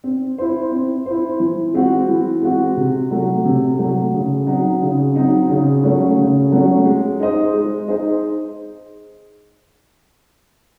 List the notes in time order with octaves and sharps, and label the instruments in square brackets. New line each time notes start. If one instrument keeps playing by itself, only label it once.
[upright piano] C4
E4 C5
C4
E4 C5
E3
G#3 C4 F#4
E3
G#3 C4 F#4
C3
F#3 A3
C3
F#3 A3
C#3
F#3 C4 D#4
C#3
F#3 C4 D#4
C#3
F#3 A3 C#4
C#3
F#3 A3 C#4
G#3
D#4 G#4 C5 D#5
G#3
D#4 G#4 C5 D#5